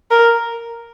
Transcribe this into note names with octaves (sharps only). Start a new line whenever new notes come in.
A#4